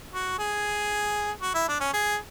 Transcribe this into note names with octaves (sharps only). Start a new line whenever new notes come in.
F#4
G#4
F#4
E4
D4
C#4
G#4